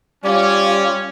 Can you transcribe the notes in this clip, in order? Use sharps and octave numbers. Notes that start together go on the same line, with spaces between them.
G3 C#4 F4 D5